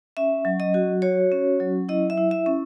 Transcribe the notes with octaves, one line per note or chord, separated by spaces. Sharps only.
C#4 E5
F#3
D#5
F#4
F#4 C#5
C#4
F#3
E4 D#5
E5
E4
E5
C#4